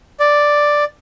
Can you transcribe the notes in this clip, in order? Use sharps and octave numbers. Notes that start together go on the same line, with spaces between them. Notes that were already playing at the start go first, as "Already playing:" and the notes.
D5